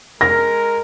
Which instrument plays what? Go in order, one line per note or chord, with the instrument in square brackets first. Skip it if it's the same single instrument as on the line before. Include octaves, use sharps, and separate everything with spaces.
[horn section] G#3 A#4 [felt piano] A#6